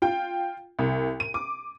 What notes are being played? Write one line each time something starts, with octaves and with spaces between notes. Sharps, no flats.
F4 G5
C2
D#7
D6